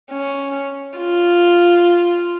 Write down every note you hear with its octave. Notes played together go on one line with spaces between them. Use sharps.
C#4
F4